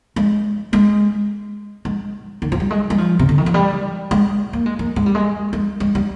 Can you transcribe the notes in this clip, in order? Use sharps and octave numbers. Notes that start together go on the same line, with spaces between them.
G#3
G#3
G#3
D#3
F3
G3
G#3
G3
F3
C3
D3
D#3
F3
G3
G#3
A#3
G#3
A#3
G#3
G3
G#3
G#3
G#3
G3